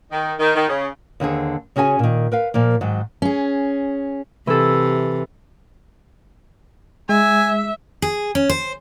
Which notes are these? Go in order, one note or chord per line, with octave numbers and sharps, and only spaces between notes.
D#3
D#3
D#3
C#3
D#2 D3 C4 G#4
C#3 C#4 F#4 G#4 G#5
A#2 D#3
A#4 B4 F5
A#2 F3 A#3
G#2 D#3 F#3
C#4 G#4
C3 E3 A4
G#3 E5 G#5
G#4
C#4
C5